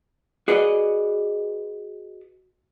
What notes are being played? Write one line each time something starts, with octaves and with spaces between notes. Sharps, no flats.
F#4 G#4 B4 D5 D#5